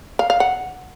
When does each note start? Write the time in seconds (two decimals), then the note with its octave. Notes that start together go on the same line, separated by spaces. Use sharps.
0.19 F5
0.30 F5
0.40 F#5